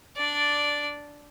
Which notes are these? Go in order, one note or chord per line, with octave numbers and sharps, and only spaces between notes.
D4 D5